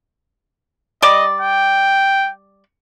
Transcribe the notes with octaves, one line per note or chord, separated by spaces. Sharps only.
G3 D5 D#5
G5